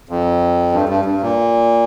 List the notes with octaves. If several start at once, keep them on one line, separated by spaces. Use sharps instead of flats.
F2
G2
G2
G2
A#2